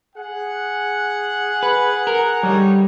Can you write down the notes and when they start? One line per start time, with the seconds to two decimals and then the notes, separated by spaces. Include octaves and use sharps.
0.16 G#4 F#5
1.63 B4
2.07 A#4
2.43 D3 G3 D#4 C#5